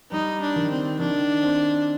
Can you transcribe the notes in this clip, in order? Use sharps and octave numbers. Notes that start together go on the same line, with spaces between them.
G3 D#4
D4
D#3
C4
D#3 D4
C4